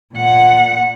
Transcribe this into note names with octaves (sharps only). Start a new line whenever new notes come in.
A#2 F#5